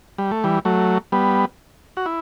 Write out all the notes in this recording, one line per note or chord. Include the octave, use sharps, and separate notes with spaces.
G3
A3
E3 G3
F#3 A3
G3 B3
F#4
E4